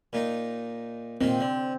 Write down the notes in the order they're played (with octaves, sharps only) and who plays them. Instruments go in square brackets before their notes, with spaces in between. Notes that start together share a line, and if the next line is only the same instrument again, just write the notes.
[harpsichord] A#2 D#4
[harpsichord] A#2 D#3 [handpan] C4
[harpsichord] D3